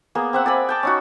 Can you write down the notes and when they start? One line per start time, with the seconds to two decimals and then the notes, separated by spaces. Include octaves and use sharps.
0.15 A#3 B3 G#4
0.33 C4 E5 F#5
0.46 D5 G#5 B5
0.69 G5 A5 D6
0.83 C#4 D#4 F#4